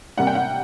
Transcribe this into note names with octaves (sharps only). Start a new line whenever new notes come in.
C3 G3 A#3 F#5
G5
F#5